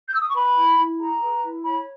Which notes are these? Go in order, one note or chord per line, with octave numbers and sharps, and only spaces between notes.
G6
E6
D#6
C#6
B4 B5
E4
E4
G#4 A#5
B4
E4
C#5 B5